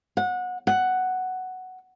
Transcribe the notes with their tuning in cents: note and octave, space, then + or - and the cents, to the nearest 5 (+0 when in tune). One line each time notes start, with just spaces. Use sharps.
F#5 -25
F#5 +5